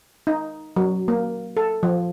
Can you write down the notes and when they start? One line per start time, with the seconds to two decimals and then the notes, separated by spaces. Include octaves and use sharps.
0.27 D#4
0.76 F#3
1.08 A#3
1.57 A4
1.83 F3